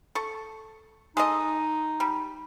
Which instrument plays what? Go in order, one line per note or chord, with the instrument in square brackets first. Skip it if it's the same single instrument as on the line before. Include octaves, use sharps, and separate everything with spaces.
[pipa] A4 C#6
[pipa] G#3 A4 D#5 [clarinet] D#4
[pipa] G3